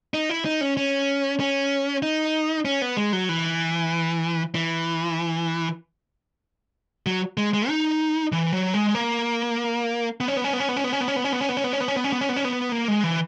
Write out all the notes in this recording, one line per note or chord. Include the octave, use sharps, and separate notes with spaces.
D#4
E4
D#4
C#4
C#4
C#4
D#4
C#4
B3
G#3
F#3
E3
E3
F#3
G#3
G#3
D#4
E3
F#3
G#3
A#3
B3
C#4
B3
C#4
B3
C#4
B3
C#4
B3
C#4
B3
C#4
B3
C#4
B3
C#4
B3
C#4
B3
C#4
B3
C#4
B3
C#4
B3
C#4
B3
C#4
B3
A#3
G#3
E3